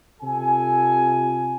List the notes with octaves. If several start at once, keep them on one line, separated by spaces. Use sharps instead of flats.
C3 F4 A4 G#5